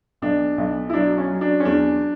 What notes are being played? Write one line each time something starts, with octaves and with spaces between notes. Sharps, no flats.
B1 D4
B1
E4
F#3 D4
C#4
F#3
D4
C#4
E2 D4